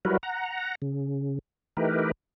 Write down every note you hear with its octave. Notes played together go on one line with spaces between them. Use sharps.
F#3 G3 E4 F#4 A#4 B4
F#5 A#5
C#3
E3 A3 D#4 G4 A#4 B4